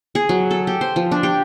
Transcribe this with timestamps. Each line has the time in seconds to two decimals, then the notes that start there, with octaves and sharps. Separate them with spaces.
0.15 G#4
0.29 F#3
0.51 A4
0.67 G4
0.81 C5
0.96 F3
1.11 D4
1.23 G4